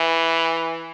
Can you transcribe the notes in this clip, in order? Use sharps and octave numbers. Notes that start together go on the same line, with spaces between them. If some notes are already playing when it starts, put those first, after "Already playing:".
Already playing: E3